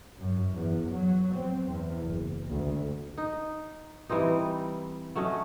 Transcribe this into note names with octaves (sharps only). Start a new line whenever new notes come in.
F#2
E2
F#3
C4
E2
F#1
D2
D#4
E3 G3 C4 D#4
F#3 A3 C#4 D#5